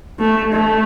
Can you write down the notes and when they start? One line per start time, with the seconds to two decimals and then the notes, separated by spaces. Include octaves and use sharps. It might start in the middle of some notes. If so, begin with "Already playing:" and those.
0.19 A3
0.52 A3